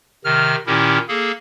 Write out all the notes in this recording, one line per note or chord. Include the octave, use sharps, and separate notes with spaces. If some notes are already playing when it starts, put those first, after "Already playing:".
C3 D#3 F6
A#2 D#3 C#4 E4 G4
A#3 G#4 A4